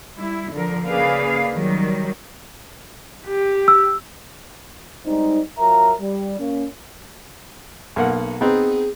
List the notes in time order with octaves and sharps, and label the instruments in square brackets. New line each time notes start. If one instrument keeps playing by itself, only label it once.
[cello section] G3 E4
D3 F3 A#4
C#3 A#3 G#4 B4 D5 F5
D#3 F#3 G3
[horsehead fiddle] G4
[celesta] E6
[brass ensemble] G3 G#3 C4 D#4
F#3 F4 A#4 E5 A#5
G3
A#3 C#4
[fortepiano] B1 A#3 F#5
[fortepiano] B3 C4 D#4 [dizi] G#4